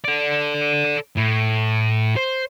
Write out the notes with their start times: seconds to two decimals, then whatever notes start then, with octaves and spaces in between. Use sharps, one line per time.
0.05 A4 D5
1.17 A2
2.16 C5